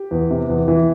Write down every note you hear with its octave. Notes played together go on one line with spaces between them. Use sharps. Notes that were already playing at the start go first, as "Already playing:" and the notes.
Already playing: G4
E2
C3
E2
E3